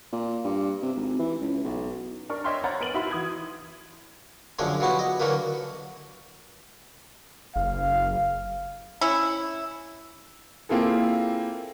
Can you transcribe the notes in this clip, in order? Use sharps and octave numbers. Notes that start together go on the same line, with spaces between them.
A#2
G2
C3
G#1
E3
C#2
B1
D4 A#4 C#6
C#5 D#5 E5 G5 C6 F6
C5 C#5 F#5 A#5 B5 A6
B3 A#4 D7 D#7 F#7
D#4 E4 F#4 E5 B5 C6
E3 D#6 G#6
F#2 D3 F3 G#3 D4 G#5
F3 F#3 B3 E4 F#4 G4
D#5
D3 E3 F#3 A#3 B4
F#1 F5
C#4 E4
A#3 C4 E4 F4 G#4 A4